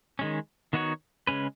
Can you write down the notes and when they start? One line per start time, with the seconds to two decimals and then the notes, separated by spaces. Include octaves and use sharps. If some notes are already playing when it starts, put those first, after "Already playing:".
0.19 D#3 G#3 C#4
0.73 D#3 B3 D#4 F#4 C#5
1.27 C#3 G#3 C#4 B4